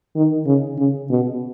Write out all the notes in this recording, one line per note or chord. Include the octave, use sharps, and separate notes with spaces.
D#3
C#3
C#3
B2